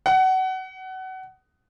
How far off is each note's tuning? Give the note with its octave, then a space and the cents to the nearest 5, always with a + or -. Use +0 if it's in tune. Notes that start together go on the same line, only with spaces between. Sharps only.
F#5 +25